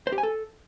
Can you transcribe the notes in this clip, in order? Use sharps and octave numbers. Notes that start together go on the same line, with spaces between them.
C5
G4
G#5
A4